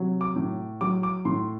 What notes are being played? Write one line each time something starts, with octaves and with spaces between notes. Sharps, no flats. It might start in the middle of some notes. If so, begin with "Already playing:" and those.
Already playing: C3 F#3
D6
A2
F#3 D6
D6
A2 C6